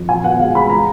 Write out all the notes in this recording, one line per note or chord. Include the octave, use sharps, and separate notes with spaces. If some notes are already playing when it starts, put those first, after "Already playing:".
Already playing: F2
A#2 G#5
B3 F#5
G#3 F5
G#3 B5
A#5